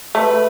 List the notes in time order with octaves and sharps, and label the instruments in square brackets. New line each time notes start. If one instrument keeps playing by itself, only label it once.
[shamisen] A3 [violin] B4